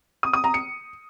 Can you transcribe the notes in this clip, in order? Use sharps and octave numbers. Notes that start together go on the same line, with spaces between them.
D#6
D#6
A#5
C#7